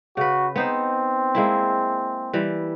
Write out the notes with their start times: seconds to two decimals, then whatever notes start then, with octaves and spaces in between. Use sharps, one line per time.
0.17 C#3 F#4 B4
0.56 B3 C4 D#4 C5
1.35 G#3 A#3 E4
2.33 E3 G3